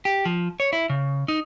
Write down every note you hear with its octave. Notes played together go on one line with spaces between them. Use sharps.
G4
F3
C#5
E4
C#3
D#4